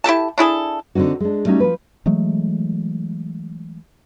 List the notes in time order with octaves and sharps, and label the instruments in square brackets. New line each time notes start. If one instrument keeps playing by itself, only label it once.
[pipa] E4 G4 A4 A5
D4 E4 G#4 A4
[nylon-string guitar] D3 C4 C#4 D#4 F#4
G#3 D4
G3 A3 C#4 D#4 F#4
F3 B4
[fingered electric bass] E3 F#3 G#3 A3